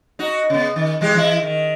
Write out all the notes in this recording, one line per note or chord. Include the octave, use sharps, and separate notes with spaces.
D#4 F#4
C#3 B3
D#3
E3 G#3 G4
E3 E4
D#3